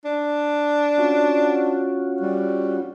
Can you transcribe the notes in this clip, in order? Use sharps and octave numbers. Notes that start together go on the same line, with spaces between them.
D4
C#4 F4 F#4
G3